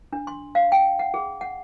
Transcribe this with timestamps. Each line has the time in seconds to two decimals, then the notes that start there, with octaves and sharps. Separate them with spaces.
0.13 D4
0.27 C6
0.55 F5
0.72 G5
0.99 F#5
1.14 G#4
1.41 F#5